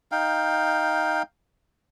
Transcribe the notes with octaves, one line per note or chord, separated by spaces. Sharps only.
D#4 F5 G5